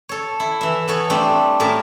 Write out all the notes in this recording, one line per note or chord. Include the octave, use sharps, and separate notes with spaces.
A4 C#5
E4
E3 E5
B3 A4 C#5
G3 A3 C4 D4
A2 C#4 A#4 A5